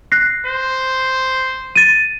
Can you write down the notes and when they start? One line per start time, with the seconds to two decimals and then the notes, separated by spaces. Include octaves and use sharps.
0.12 F#6 A#6 C7
0.47 C5
1.76 A6 D#7